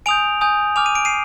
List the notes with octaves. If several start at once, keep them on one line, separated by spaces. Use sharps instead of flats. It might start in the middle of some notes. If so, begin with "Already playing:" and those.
G#5 D#6 G6 D7 F7
G#5 D#6 G6
G#5 D6 F6 F7
D#7
D7
C7 D#7